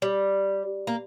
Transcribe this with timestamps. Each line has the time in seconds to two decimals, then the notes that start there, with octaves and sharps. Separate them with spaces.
0.02 G3
0.87 A#3